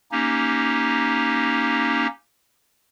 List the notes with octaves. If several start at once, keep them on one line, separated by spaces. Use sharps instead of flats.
A#3 C#4 D#4 G4